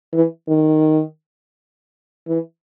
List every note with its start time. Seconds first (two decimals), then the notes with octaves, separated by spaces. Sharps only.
0.13 E3
0.48 D#3
2.27 E3